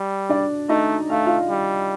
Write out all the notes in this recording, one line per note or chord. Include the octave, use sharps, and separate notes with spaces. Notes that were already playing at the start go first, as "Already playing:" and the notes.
Already playing: G3
D4 D5
A3 D#4 D#5
A3 F5
F4 F5
G3